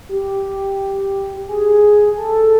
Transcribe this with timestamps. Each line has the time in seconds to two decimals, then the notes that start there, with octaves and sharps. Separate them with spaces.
0.09 G4
1.48 G#4
2.17 A4